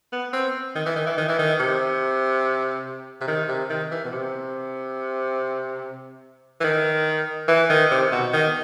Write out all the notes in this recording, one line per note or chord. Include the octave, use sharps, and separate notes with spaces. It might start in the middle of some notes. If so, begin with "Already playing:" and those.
B3
C4
D#3
E3
D#3
E3
D#3
E3
D#3
C3
C3
D#3
C3
D#3
E3
B2
C3
E3
D#3
E3
D#3
C3
B2
D#3